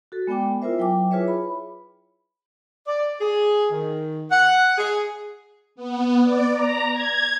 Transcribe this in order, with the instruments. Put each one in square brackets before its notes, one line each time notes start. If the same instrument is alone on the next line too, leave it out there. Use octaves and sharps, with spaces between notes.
[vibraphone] F#4 A4
G#3 B3 D5 G5 D6
E4 F4 A#4 C5 E5
F#3 G5 G#5 D6
E4 F4 G#4 B4 C#5 E5
B5
[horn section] D5
G#4
D#3
F#5
G#4
[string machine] B3
D5
A#5
G#6